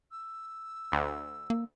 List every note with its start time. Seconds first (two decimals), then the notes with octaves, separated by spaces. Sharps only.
0.11 E6
0.92 D2
1.50 A#3